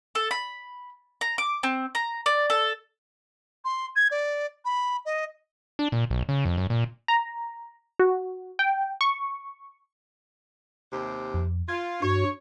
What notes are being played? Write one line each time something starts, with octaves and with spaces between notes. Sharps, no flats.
A4
B5
A#5
D6
C4
A#5
D5
A4
C6
G#6
D5
B5
D#5
D4
A#2
B1
C#3
F2
F#2
A#2
A#5
F#4
G5
C#6
D#2 C3
F2
F4 G#6
G2 F#4 C#5